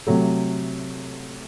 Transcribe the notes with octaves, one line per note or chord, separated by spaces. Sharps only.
C3 F#3 A3